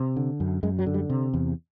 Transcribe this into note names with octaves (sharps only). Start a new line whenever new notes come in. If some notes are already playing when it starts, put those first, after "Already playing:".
Already playing: C3
D3
F#2
F#2 G#3
F#3
D3
G3
C3
E2